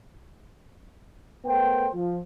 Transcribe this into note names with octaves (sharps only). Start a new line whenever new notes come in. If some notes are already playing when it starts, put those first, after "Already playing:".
A3 B3 A#4 C5 G5
F3